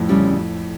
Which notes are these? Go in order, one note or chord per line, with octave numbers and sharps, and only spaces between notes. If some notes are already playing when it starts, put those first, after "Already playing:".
Already playing: F2 A2
D2 C#3 G3 C#4